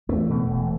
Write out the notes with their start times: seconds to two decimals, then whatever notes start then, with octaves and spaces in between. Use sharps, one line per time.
0.09 E2 A3
0.30 B2
0.51 E1